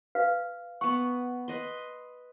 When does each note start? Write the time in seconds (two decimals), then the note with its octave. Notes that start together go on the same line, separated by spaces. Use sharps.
0.15 B4 F5
0.81 B3 F#5 C#6
1.48 B4 D#5 C6